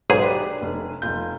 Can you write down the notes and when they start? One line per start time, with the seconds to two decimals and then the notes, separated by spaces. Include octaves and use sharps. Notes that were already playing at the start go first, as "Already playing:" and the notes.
0.10 B1 G#2 G#4
0.22 D4 G4 B4
0.62 F1
1.02 F1 F4 G6